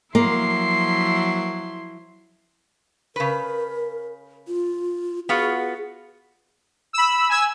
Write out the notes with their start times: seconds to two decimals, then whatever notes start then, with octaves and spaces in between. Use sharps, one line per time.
0.15 F3 F#3 A#3 E4 C6
3.16 C#3 A#4 B4
4.48 F4
5.29 B3 F4 F#4 G#4
6.93 B5 E6
7.29 G#5 E6